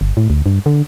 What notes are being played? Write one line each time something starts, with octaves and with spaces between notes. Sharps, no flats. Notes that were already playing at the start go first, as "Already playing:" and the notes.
G1
A2
D2
G2
D3